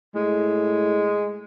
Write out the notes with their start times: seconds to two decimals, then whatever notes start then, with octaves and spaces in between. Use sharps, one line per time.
0.15 A2 G#3